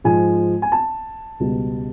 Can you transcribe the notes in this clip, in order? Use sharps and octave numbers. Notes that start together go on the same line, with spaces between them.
G#2 F3 G#3 G#5
G#5
A5
C#2 B2 G3